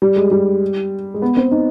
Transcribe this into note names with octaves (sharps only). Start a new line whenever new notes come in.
G3
G#3
G3
G#3
B3
C4
D#4